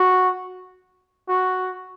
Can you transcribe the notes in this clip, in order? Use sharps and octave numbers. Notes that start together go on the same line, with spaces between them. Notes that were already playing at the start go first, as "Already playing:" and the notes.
Already playing: F#4
F#4